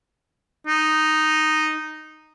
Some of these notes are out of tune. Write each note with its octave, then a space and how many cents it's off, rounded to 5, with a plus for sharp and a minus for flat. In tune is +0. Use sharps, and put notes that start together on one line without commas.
D#4 -5